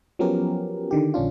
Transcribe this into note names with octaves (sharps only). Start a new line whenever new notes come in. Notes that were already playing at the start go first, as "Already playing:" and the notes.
F3 F#3 B3 C#4 G4 A#4
D3 D#3 G4
A#1 D3 C#4 D4 F4